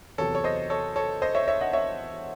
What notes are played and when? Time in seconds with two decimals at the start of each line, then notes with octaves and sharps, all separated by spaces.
0.18 E2 C3 F#3 A4 C#5
0.35 C#5
0.44 C5 D#5
0.70 A4 C#5
0.96 A4 C#5
1.22 C5 D#5
1.35 C#5 E5
1.48 C#5 E5
1.61 D#5 F#5
1.73 C#5 E5